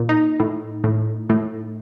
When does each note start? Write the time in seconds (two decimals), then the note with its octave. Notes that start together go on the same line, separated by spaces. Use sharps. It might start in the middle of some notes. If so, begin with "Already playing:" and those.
Already playing: A#2
0.09 D#4
0.40 A2
0.84 A2
1.29 A2